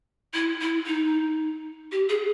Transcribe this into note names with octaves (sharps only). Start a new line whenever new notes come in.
E4
E4
D#4
G4
G#4